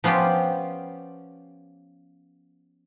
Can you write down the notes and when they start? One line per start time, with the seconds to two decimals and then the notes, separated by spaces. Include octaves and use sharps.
0.04 F3 B3 C#4 F4 G4